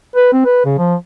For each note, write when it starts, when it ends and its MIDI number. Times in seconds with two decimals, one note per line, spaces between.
0.16 0.29 71
0.33 0.44 60
0.45 0.62 71
0.65 0.73 49
0.78 0.95 53